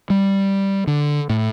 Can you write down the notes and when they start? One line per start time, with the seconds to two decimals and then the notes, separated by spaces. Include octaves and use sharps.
0.10 G3
0.87 D3
1.29 A2